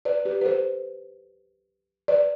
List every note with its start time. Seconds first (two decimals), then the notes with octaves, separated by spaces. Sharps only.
0.05 B4 D5
0.25 G4 B4
0.41 B4
0.46 A4 C5
2.08 B4 D5